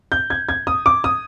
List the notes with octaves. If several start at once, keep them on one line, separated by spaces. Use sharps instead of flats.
G6
G#6
G#6
D#6
D6
D#6